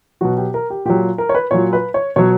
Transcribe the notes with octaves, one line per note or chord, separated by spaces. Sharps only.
B2 F#3 F#4
G4
A#4
G4
A#2 F#3 G4
A#4
C#5
B4
A#2 F#3 C#5
B4
C#5
B2 F#3 C#5